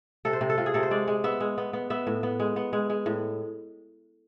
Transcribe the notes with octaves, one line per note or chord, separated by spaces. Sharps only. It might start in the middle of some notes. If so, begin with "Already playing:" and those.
C3 A4
C5
C3
A4
C3 F4
G#4
C3 A4
C5
G#3 D5
G#3
B3 E5
G#3
B3
B3
B3 E5
A2
B3
G#3
B3
G#3
G#3
A2